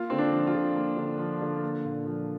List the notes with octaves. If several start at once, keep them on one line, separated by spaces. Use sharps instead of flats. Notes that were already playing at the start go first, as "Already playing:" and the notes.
Already playing: A#3 F4
D3 C4
D4
F3
F4
D3
A#3
D3
F3
D3
A#3
A#2
F3